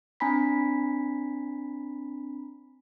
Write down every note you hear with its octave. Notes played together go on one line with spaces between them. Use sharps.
C4 D4 G#5 A#5 B5 B6